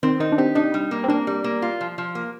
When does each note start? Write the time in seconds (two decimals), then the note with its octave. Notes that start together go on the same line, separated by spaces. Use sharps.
0.03 D#3 C4
0.20 D#3 D#4
0.32 D4
0.38 C4 G4
0.55 D4 D#4
0.74 G3
0.91 A#3
1.04 C4
1.08 A#3 D4
1.27 G3
1.44 A#3
1.62 F4
1.81 F3
1.98 F3
2.15 A#3